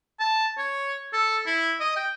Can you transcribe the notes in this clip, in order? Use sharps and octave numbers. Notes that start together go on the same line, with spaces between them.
A5
C#5
A4
E4
D#5
G5